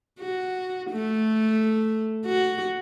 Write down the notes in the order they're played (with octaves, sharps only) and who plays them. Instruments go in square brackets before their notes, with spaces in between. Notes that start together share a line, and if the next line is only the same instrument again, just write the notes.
[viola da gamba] F#4
A3
F#4